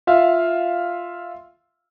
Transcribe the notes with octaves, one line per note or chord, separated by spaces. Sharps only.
F4 E5 F5